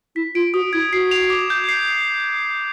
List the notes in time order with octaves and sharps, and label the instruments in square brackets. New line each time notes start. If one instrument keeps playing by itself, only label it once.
[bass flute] E4 [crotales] B6
[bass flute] F4 [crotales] D7
[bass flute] F#4 [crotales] D#6
[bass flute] E4 [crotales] G#6
[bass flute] F#4 [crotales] C7
[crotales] F7
D6
G6
C7